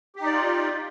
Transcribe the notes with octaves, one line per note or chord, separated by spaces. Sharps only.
D#4 F4 G4 D5